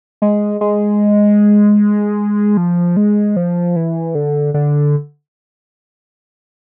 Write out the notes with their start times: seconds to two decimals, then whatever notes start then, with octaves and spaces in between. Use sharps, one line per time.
0.22 G#3
0.61 G#3
2.57 F3
2.97 G#3
3.36 F3
3.76 E3
4.15 D3
4.54 D3